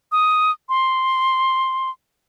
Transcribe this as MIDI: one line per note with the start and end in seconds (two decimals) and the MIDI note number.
0.12 0.51 87
0.69 1.90 84